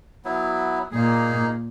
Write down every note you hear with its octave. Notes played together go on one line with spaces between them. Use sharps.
F#3 B3 E4
A#2 A#3 D#4 G#4